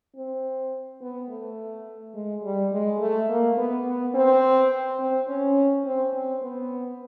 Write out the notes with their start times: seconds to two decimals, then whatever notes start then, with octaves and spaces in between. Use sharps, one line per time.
0.16 C4
1.01 B3
1.30 A3
2.15 G#3
2.44 G3
2.72 G#3
3.00 A3
3.29 A#3
3.58 B3
3.87 B3
4.15 C4
5.00 C4
5.29 C#4
5.85 C4
6.14 C4
6.42 B3